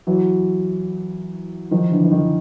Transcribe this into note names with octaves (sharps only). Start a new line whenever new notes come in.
E3 F#3
D#3 F3
D3 E3
E3
D#3